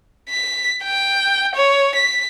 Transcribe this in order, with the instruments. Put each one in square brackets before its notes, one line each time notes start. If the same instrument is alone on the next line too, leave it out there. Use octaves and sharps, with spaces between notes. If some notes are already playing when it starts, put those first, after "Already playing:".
[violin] B6
G5
C#5
B6